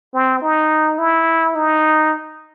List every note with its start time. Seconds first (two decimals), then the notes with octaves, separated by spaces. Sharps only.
0.14 C4
0.42 D#4
0.98 E4
1.55 D#4